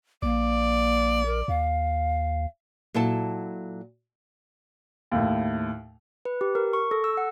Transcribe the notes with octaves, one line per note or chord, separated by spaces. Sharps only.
A#1 A#3 D5
A#4
D#2 F5
A#2 F#3 E4 A4 A5
D#2 A2
B4
G4
A#4
C#6
A4
E6
F#5